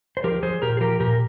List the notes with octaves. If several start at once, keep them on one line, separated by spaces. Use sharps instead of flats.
C5
F3 G4 A#4
F3 G#4 C5
A#2 G4 A#4
G#4
F3 G4 A#4
A#2 G4 A#4